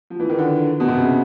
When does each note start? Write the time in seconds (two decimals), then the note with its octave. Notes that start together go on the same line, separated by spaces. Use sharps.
0.10 F3
0.20 E3
0.29 D#3
0.39 D3
0.80 B2
0.88 C3
0.96 C#3